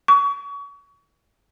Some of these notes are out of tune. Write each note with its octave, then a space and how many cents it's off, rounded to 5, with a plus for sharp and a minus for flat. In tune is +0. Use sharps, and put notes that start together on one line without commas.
C#6 +30